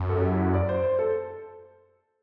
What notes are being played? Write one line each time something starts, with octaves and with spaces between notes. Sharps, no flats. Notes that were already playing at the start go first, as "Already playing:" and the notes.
Already playing: F#2
A4
F#4
G4
E4
F#4
D5
C5
C5
A4